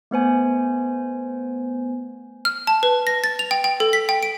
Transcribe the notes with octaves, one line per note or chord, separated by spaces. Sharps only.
A3 B3 C5 G#5
F6
A5
B4
A#6
A6
F7
G5
G5
A4
B6
G5
D7